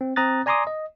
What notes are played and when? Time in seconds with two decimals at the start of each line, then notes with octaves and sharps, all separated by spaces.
0.01 C4
0.16 C4 A#5 D#6 F#6 A6
0.46 D5 G#5 A#5 C6 D6 D#6
0.67 D#5